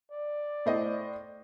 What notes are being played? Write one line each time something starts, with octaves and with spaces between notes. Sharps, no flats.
D5
A2 C5 D#5